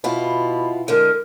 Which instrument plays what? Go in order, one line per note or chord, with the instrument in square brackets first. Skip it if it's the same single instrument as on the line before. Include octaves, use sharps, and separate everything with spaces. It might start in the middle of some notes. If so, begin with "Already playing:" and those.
[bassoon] B2 [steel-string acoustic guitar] E4 F4
[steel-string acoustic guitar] D3 G#3 [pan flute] A#4